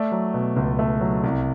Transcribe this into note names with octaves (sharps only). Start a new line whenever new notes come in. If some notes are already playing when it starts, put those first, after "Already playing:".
Already playing: A3 D5
F#3
B2
C#2
A3
F#3
C2